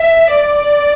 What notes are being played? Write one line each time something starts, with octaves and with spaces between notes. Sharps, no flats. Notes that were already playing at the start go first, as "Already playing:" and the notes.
Already playing: E5
D5